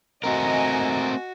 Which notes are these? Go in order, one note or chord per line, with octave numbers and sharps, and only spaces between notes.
A3 C4 F#4 A#4 D#5 G#5 A#5